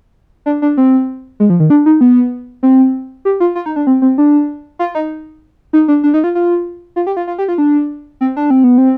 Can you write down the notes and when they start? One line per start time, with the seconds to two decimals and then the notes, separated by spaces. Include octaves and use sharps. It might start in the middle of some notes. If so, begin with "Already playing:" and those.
0.46 D4
0.62 D4
0.77 C4
1.40 G#3
1.50 F3
1.60 D#3
1.70 D4
1.86 D#4
2.01 B3
2.63 C4
3.25 G4
3.40 F4
3.55 F4
3.66 D#4
3.76 D4
3.87 C4
4.02 C4
4.18 D4
4.79 F4
4.95 D#4
5.73 D#4
5.88 D4
6.04 D4
6.14 D#4
6.24 F4
6.35 F4
6.96 F4
7.07 G4
7.17 F4
7.28 F4
7.38 G4
7.48 F4
7.58 D4
8.21 C4
8.37 D4
8.50 C4
8.64 B3
8.78 C4